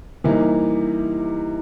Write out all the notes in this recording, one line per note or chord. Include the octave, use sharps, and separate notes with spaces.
C3 E3 G3 A#3 D#4